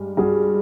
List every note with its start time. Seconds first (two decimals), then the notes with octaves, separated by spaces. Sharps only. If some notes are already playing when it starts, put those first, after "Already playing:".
Already playing: G2 G#3
0.17 G2 F#4 G#4